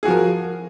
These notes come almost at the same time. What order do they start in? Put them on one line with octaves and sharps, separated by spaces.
G#4 F#4 F3 A#4